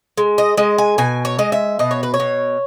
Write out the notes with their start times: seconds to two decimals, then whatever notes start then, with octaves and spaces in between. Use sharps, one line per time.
0.17 G#3
0.38 D#5
0.57 G#3 D#5
0.78 G#5
0.98 B2 G#5
1.25 C#5
1.39 G#3 D#5
1.52 E5
1.79 B2 D#5
1.91 C#5
2.03 B4
2.14 C#5
2.20 B2